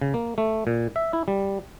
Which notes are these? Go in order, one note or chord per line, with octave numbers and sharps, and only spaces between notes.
C#3
A#3
A3
A#2
E5
E4
G3